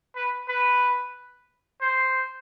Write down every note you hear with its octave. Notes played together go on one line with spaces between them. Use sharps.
B4
B4
C5